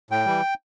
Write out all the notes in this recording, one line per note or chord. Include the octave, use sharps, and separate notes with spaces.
A2 G5
E3 G3